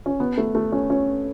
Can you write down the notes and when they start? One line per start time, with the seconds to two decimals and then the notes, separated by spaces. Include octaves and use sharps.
0.06 C#4
0.20 B3
0.38 A3
0.55 A3
0.72 C#4
0.90 C#4